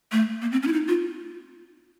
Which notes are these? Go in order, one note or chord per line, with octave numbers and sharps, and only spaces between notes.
A3
A#3
C4
C#4
E4
D#4
F4